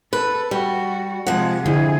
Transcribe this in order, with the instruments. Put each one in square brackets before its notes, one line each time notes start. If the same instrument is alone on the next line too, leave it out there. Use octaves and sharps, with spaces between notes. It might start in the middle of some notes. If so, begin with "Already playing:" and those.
[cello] A4 [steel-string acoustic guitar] B4
[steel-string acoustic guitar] G3 [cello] F#4
[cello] C3 G#3 [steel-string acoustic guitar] F3 F#5
[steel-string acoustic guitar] F2 [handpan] D3 E4 [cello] G#4